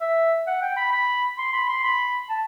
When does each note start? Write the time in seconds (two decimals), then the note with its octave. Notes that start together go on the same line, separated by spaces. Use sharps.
0.01 E5
0.47 F#5
0.62 G5
0.76 B5
0.92 B5
1.38 C6
1.53 B5
1.69 C6
1.83 B5
2.29 A5